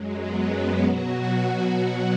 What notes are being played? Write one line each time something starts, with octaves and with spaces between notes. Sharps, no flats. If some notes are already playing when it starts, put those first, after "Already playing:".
Already playing: F#2 F#3 G#3
B3
B2 F#3 F#4